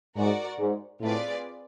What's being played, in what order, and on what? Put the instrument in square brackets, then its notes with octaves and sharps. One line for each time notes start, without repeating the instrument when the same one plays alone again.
[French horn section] G#2 [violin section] F#4 A#4 D5 F#5
[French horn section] G#2
[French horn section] A2 [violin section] C4 F4 G#4 B4 D5